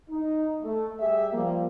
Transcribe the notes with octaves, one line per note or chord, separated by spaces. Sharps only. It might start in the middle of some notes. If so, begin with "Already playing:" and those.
D#4
A3
G3 G4 G#4 E5
F3 G3 A#3